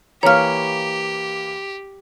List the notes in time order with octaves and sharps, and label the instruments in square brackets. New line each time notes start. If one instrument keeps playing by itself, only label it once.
[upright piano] E3 A#3 [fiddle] G4 [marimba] C#5 F6 [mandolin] A#5 B5 C#6